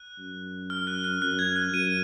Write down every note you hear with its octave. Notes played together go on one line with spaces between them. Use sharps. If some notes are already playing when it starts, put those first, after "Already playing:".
Already playing: F#6
F#2
F6
F#6
F#6
F#2 F#6
G#6
F#6
F#2 D#7